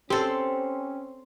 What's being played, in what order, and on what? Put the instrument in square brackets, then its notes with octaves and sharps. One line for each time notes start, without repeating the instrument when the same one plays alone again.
[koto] C4 A4 [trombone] C#4 [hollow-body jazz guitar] G4 [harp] C5 C6